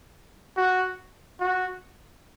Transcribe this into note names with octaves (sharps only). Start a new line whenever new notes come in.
F#4
F#4